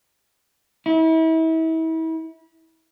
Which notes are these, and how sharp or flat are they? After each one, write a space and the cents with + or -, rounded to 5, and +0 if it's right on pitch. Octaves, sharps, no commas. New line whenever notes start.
E4 -35